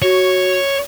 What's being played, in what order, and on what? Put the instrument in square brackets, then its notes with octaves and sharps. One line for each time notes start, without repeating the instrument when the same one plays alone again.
[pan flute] F#4 [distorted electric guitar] C#5